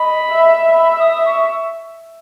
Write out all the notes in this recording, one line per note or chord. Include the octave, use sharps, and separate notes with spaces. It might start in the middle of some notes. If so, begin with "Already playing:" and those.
Already playing: D#5 B5
E5
E5 B5
E6
D#6
C#6